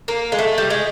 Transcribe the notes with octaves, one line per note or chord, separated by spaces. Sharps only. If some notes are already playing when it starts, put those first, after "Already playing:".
A#3
G#3
A3
G3
G#3